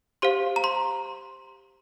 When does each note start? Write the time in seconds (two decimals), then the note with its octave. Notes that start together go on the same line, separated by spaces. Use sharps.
0.22 G4 C5 F5 C6
0.56 A#5
0.64 C6